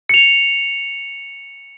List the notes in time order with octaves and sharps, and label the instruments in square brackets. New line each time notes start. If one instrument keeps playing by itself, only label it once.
[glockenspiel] C#7 F7